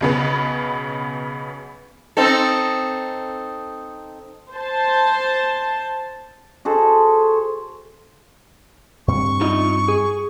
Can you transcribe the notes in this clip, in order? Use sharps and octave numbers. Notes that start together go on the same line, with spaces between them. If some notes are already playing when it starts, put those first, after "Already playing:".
B1 C#3 B3
C4 D#4 A4
C5 A5
F#4 G#4 A4 C5
G2 C4 C#6
D#4 F4 D#5
G#4